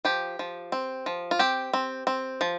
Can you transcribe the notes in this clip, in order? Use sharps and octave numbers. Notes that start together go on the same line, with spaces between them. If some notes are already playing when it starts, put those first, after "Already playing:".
F3 G4
F3
C4
F3
F4
C4 G4
C4
C4
F3